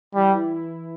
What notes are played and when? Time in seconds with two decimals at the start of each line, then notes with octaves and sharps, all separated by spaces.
0.15 E3 G3
0.34 E4